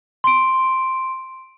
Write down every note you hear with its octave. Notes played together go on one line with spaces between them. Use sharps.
C6 D7